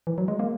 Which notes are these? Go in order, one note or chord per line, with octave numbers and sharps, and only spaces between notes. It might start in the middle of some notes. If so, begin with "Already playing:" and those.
E3
F#3
G#3
A#3